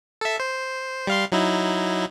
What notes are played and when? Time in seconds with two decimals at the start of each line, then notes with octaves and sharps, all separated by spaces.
0.21 A4 E5
0.40 C5
1.07 G3 F5 C6
1.32 F#3 D#4 E4